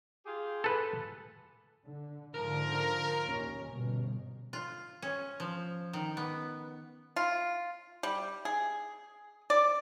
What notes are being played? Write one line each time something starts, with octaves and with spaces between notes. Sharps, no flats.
F4 G4 G#4
A4 B4
D3
G#2 D3 F3 A#4
D#2 A#2 C#4
G1 B2
F4
C#4
F3
D#3
B3
F4
G3
G#4
D5